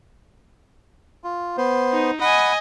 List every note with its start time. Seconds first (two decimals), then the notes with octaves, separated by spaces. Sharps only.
1.24 F4
1.57 B3 C5
1.93 D#4
2.21 D#5 F#5 G#5 B5